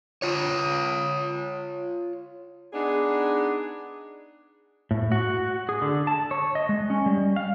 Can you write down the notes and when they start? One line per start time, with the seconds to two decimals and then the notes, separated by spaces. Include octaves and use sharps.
0.22 F4 C#5
2.72 B3 D4 D#4 G#4
4.91 A2
5.12 F#4
5.69 G#4
5.82 D3
6.07 A5
6.31 C#5
6.55 D#5
6.69 G#3
6.90 C#4
7.06 G3
7.36 F5